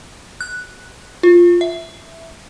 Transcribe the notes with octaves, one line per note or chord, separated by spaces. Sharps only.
F#6
F4
E5